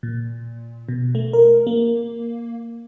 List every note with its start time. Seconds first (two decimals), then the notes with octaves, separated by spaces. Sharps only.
0.03 A#2
0.89 B2
1.15 A3
1.33 A#4
1.67 A#3